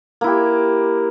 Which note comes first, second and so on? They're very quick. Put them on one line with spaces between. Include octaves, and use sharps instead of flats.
A#3 E4 G4